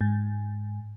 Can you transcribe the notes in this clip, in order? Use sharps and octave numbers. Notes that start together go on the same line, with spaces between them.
G#2